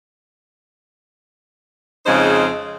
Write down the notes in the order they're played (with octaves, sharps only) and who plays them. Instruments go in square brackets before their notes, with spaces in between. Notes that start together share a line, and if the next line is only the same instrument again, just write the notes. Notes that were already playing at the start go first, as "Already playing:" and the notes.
[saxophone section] F2 C#3 G#3 D#4 C5